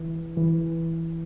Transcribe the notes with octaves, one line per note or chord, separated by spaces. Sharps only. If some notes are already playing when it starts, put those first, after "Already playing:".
Already playing: E3
E3